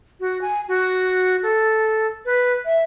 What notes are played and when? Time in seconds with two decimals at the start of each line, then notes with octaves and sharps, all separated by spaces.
0.20 F#4
0.41 G#5
0.68 F#4
1.43 A4
2.25 B4
2.65 E5